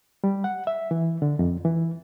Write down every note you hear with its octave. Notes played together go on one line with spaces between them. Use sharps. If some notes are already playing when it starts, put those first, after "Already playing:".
G3
F#5
E5
E3
D3
F2
E3